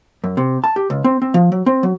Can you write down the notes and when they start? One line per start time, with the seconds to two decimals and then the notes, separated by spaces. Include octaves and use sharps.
0.24 F#2
0.37 C3
0.64 A5
0.76 G4
0.90 C#2
1.04 C4
1.22 C4
1.34 F3
1.52 F#3
1.66 C4
1.83 F#3